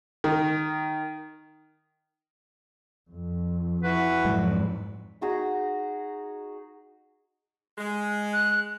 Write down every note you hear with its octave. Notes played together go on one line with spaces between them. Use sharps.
D#3
F2
E3 F#4 B4
F2 G#2 F#3 G#3
D#4 F#4 G#4 A#5
G#3
F#6